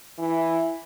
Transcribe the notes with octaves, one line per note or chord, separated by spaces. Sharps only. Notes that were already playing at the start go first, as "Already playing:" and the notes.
E3